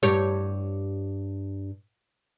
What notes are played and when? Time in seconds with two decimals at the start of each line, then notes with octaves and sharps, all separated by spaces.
0.03 G2 G4 C#5